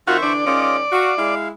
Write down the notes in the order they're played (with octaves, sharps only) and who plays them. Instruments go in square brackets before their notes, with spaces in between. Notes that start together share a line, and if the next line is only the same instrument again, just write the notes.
[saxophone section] D#3 C4 [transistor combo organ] F4 F#4 [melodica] C5 E5 C#6
[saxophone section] D3 E3 D4 [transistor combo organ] D5
[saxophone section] D#3 G#3 C#4 [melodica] F4 D#5 D6
[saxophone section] F#4 [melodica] F5
[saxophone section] G#3 E4 [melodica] F5